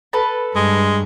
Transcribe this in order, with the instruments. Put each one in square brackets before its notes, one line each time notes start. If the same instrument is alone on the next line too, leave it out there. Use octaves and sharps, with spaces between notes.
[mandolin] A4 B4 A5
[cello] G2 [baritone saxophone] G#3